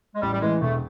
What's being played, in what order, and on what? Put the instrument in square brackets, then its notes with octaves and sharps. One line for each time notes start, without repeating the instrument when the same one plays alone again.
[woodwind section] G#3
[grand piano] A1 [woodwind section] G3
[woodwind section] G3
[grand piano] A2 E3 [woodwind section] G#3
[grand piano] E1 [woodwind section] A3